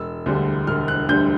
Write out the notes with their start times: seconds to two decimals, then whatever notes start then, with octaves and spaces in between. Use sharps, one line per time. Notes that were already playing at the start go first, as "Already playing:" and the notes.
Already playing: E1 E6
0.26 D2 D3 G3
0.67 E1 F6
0.88 F#6
1.09 D2 D3 G3 G6